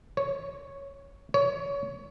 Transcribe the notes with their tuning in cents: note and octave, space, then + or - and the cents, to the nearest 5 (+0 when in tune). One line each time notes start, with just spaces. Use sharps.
C#5 +0
C#5 +20